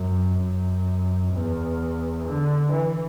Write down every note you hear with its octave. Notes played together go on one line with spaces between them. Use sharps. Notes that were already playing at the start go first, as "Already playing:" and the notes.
Already playing: F#2
F#2
E2
D3
E3